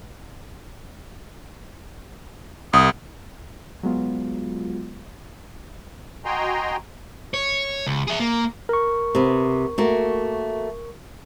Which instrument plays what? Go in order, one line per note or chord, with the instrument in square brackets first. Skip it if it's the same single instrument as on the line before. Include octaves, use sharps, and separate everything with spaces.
[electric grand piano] C2 [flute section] D#6
[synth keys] F#3 G#3 B3 F4
[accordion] F#4 D#5 G5 G#5 A#5 C6
[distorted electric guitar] C#5
C#2
G#4 E5
A#3
[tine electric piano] A#4 C#6
[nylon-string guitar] C3 B3
A3 A#3 F#4